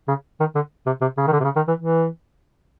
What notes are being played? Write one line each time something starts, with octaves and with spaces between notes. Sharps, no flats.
C#3
D#3
D3
C3
C3
C#3
D#3
D3
C3
C#3
D#3
E3
E3